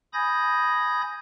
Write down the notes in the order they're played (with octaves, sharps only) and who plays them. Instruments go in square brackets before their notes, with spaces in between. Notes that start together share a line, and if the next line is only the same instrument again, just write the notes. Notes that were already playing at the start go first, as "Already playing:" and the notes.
[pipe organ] G#5 B5 D#6 G6 G#6 A#6